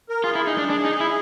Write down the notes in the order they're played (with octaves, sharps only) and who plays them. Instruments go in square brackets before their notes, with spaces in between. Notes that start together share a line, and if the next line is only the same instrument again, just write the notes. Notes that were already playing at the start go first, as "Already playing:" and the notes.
[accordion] A#4
[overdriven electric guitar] F4 [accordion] G#4
[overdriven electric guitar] E4
D#4
D4
D4
D#4
E4